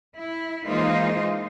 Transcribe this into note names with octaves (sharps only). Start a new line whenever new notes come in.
E4
E3 G#3 A#3 D#4 F4 C5